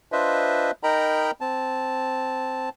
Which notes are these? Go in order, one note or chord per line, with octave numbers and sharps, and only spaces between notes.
D4 F4 B4 C5 D#5 E5
D#4 A#4 D#5 G5 A#5 B5
C4 A5